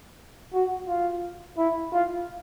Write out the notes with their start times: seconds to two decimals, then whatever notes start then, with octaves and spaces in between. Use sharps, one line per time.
0.53 F#4
0.88 F4
1.57 E4
1.92 F4